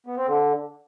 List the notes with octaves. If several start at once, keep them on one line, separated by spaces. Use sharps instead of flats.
B3
C4
D3